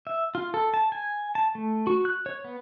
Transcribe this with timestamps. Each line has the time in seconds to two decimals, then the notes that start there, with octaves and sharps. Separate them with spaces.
0.07 E5
0.35 F4
0.54 A4
0.74 A5
0.92 G#5
1.35 A5
1.55 A3
1.87 F#4
2.05 F#6
2.26 C#5
2.44 B3